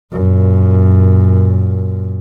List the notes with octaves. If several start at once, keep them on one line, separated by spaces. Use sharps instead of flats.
F#2 A#2